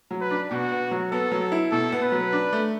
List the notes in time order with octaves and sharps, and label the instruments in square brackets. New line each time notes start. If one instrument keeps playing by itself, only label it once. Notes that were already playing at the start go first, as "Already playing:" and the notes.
[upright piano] F#3
[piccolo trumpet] B4
[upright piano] D4
[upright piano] B2 [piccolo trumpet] F#4
[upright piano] B3
F#3
[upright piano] B3 [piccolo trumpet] A4
[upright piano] F#3
E4
[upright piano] B2 [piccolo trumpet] A4
[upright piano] B3
[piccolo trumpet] B4
[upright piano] F#3
D4
A3